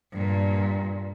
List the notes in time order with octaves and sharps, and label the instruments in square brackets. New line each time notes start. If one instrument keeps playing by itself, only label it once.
[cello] G2 A#2